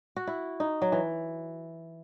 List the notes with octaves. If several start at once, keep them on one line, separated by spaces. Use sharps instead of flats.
F#4
E4
D#4
F#3
E3